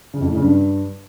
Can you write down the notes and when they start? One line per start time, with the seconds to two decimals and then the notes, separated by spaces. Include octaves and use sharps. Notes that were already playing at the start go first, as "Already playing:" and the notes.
0.14 C#3
0.21 F2
0.28 A2
0.35 C#3
0.42 G2